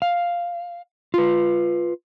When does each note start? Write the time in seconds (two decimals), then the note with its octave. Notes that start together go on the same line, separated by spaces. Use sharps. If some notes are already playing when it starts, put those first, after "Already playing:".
0.02 F5
1.14 F4 B4